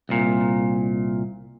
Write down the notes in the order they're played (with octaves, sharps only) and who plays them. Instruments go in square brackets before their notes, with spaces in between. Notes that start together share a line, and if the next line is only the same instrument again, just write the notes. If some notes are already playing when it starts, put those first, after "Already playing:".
[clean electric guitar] C2 A#2